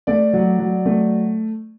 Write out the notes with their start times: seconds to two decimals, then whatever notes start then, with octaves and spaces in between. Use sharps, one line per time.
0.07 A3 D5
0.33 F#3
0.59 F#3
0.86 A3